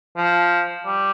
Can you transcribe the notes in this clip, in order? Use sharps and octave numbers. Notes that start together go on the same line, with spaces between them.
F3
G3